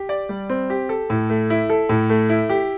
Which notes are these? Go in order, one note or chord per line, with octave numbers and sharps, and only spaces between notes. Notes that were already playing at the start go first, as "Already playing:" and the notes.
Already playing: G4
D5
G3
C4
G4
A4
A2
A3
E4
A4
A2
A3
E4
G4